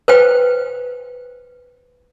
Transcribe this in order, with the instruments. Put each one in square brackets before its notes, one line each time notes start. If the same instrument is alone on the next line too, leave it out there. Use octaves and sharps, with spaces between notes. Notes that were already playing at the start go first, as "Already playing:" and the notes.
[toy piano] B4 C5 G5